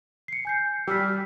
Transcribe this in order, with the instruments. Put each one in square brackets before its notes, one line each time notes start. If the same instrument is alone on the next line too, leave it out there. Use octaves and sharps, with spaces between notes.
[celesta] C7 C#7
G#5 G6 C7
[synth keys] G3 [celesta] E6 F6 B6